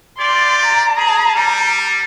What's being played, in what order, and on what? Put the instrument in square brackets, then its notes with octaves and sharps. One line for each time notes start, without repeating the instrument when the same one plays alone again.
[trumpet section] F4 G4 D5 [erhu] C6
[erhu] A#5
[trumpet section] G#4
G3